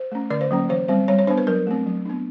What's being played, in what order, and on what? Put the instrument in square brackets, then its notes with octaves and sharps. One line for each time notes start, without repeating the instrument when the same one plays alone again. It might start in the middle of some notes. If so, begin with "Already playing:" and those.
Already playing: [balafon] C5
A3 C#4
D3 D5
C5
F#3 A#3 C#4
E3 C5
G3 C4 C5
G3 C#5
C#5
B3 D4 C5
B4
F#3 A#4
A3 C4
F#3
B3 D4